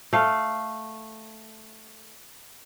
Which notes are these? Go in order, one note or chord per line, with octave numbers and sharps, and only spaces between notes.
A3 F5